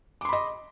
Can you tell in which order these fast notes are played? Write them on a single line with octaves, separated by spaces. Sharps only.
D6 C6 B5 D#5